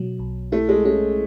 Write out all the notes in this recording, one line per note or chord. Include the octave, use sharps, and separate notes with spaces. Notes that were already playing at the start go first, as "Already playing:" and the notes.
Already playing: B2 F#3
B1
A3 E4
G#3
G#3 C#4